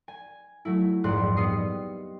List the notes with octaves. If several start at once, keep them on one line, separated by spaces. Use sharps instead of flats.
G#5
F#3 A3 E4
A#1 F2 G#2 C6 F#6
G3 B3 D#5 D#6 C7 C#7